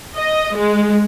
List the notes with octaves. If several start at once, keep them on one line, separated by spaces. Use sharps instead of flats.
D#5
G#3